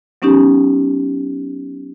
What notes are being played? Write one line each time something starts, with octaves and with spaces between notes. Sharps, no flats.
F#3 B3 C#4 D#4 G4